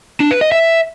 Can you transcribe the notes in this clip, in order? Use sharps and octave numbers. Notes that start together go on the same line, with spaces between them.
D4
B4
D#5
E5